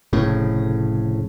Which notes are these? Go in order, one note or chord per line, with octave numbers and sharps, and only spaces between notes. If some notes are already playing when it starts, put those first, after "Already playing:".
F1 A2 C#3